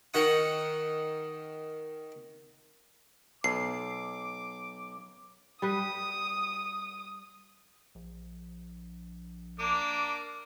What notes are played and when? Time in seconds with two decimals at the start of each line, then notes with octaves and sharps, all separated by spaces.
0.14 D#3 D#4 F#5 C#6 D#6
3.44 B1 D6 C7
5.62 G3 B4 D#6
7.95 A#1
9.59 A#3 D4 D6